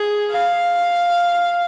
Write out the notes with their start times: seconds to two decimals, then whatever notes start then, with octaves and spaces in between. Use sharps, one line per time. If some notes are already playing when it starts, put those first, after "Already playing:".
Already playing: G#4
0.31 F5